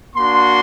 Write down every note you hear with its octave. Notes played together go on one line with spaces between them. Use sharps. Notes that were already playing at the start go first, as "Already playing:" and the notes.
A#3 D4 F#4 C6